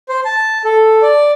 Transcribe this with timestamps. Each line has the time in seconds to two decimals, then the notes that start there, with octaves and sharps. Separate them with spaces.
0.09 C5
0.25 A5
0.65 A4
1.02 D5